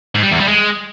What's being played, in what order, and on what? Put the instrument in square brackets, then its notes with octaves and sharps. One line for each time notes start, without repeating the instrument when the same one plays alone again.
[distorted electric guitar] G#2
G3
E2
G3
G#3